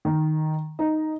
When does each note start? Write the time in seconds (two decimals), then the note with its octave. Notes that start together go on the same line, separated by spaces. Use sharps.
0.05 D#3
0.79 D#4